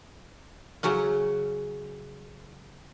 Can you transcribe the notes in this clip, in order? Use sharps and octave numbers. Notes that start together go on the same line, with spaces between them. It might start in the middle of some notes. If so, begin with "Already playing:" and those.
C#3 F#3 C#4 F#5